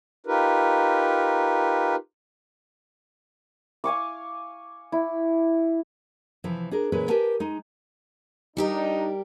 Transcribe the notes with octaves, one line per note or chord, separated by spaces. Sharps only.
D#4 F4 G4 A#4 B4
F5 G#5 C#6 D6
E4
C3 E3 F3
D4 G#4 A#4
A#2 E3 G#3 C#4 B4
G4 A#4 B4 G#5 A5
G#3 D#4
G3 D4 D#4 G4 A#4